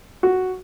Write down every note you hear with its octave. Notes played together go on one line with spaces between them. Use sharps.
F#4